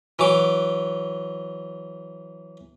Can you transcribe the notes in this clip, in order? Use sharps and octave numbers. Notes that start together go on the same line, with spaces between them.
E3 F#3 D6